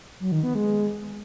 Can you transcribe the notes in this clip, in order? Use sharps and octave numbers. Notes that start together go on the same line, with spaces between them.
F#3
D#3
B3
G#3